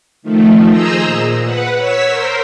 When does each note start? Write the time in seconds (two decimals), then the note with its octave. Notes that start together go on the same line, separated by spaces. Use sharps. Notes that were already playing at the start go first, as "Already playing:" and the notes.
0.22 D#3 F3 A3
0.70 G#4 C5 D#5 A#5 E6
1.02 A#2
1.43 B4 F#5
1.76 C#5 E6 B6
2.06 A#4 C5